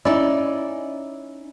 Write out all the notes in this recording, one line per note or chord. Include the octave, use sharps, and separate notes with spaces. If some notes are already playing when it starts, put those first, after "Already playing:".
C#4 D#4 E4 D5